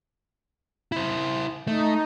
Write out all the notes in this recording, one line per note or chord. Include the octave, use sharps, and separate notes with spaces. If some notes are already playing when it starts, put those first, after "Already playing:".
E4 C5
A3 D#4